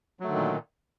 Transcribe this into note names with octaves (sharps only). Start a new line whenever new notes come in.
A#2 D3 D#3 F#3 A3